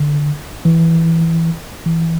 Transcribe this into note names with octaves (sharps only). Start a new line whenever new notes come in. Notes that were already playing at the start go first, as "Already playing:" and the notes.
Already playing: D3
E3
E3